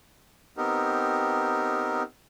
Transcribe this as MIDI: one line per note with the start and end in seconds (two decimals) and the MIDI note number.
0.57 2.03 59
0.57 2.03 60
0.57 2.03 63
0.57 2.03 67
0.57 2.03 70